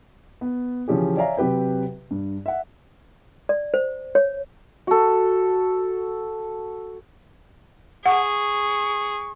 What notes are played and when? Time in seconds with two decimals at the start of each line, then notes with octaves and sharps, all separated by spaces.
0.41 B3
0.88 C#3 E3 F3 C#4 G4 G#4
1.17 C#5 D5 E5 F5 G#5 A#5
1.37 C3 F#3 G4 B4 G5
2.11 G2
2.46 E5 F#5
3.49 D5
3.74 C5
4.15 C#5
4.87 F#4 A4
8.06 G#4 F#5 C#6